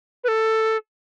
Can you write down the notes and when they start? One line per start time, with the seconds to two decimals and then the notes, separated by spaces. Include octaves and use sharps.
0.24 B4
0.28 A4